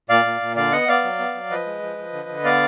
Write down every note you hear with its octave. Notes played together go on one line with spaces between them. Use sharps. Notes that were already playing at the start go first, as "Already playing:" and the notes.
A#2 D5 F5
A#2
A#2
D3 D5 F5
B3 D#5 F#5
B3 D5 F5
F#3
B3
F#3
F3 B4 D#5
G#3
F3
F3
D3
D3
B3 D5 F5